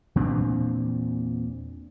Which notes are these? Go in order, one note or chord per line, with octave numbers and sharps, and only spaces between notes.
E2 A#2 C4 D4